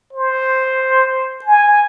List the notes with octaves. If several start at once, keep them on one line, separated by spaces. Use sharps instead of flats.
C5
G#5